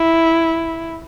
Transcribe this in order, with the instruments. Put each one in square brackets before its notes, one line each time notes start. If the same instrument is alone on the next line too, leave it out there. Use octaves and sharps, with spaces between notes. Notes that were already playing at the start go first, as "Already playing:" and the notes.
Already playing: [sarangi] E4